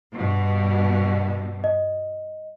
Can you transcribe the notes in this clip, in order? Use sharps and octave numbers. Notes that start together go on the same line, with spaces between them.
G2 B2
D#5